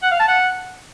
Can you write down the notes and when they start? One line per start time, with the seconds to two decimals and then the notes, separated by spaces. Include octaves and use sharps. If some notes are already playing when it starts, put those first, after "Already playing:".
0.03 F#5
0.11 F5
0.19 A5
0.28 F#5